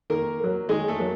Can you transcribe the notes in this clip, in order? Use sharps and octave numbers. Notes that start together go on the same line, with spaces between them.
D#3 A#3 A#4
F#3 A#3
D#3 G#3 G#4
A3 A4
F#3 A#3